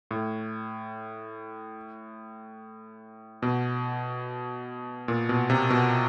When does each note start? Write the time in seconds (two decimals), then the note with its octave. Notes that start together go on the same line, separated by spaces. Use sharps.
0.11 A2
3.42 B2
5.08 A#2
5.29 B2
5.50 C3
5.70 B2